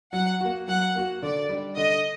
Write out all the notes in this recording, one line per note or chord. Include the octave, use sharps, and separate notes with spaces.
F#3 F#5
A#3 F#4
F#3 F#5
A#3 F#4
D3 D5
G3 D4
D3 D#5